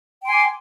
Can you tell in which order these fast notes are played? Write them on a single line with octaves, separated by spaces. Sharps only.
G5 C6 G#5 D6